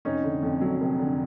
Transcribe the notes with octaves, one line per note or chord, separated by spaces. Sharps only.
F1 C#4 D#4
D3
F2
F#3
F1
D3